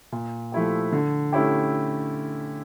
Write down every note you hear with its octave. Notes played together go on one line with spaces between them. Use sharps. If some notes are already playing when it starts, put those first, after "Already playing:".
A#2
F3 A3 E4 G4
D3
A3 C#4 E4 G4